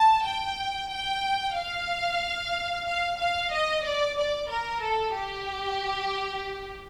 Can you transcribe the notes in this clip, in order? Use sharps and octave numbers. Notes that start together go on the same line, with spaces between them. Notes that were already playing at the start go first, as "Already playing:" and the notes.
Already playing: A5
G5
G5
F5
F5
F5
D#5
D5
D5
A#4
A4
G4